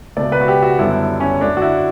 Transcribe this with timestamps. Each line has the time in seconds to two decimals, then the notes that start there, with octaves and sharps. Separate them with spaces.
0.16 C#2 B2 A3 D5
0.32 B4
0.41 F#4
0.48 G4
0.63 F#4
0.79 F#2 D3 G3 B3 E4
1.20 C#4
1.41 D2 D3 A3 D4
1.57 F#4
1.61 E4